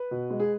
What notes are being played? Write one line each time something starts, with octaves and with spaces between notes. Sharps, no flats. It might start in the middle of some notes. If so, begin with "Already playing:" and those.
Already playing: B4
B2
G#3
G#4